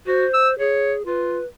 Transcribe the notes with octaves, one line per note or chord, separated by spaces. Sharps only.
F#4 C5
E6
G#4 C#5
F4 B4